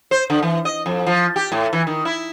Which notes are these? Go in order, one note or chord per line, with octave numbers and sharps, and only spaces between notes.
C5
D3
E3
D#5
F2
F3
G4
A2
E3
D#3
E4